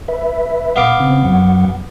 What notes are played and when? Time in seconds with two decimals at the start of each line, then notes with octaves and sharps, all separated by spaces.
0.08 B4 E5
0.76 B3 F5 D6
1.00 C#3 C4
1.25 F#2 F#3 F#5